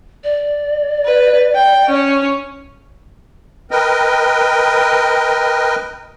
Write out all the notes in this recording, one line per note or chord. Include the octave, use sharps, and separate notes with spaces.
D5
B4
G5
C#4
A#4 B4 D#5 G5